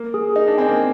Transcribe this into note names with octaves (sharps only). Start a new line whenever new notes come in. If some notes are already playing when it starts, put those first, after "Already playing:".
Already playing: A#3
G#4
D#4 D#5
D4
C4 G#5
A#3